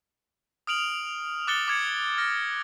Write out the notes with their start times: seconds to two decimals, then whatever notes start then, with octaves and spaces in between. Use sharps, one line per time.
0.67 D#6 F6 D7 F7 F#7
1.47 D6 F#6 A6 C#7 G7
1.68 D6 G#6 C#7
2.18 F6 A6 A#6